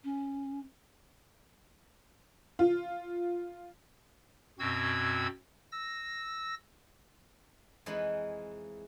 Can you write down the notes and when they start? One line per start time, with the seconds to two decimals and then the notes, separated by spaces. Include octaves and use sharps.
0.04 C#4
2.59 F4
4.59 F#2 B2 C4 F#4 E6 G#6
5.72 E6 A#6
7.86 F2 E3 G#3 D#4 B4 B5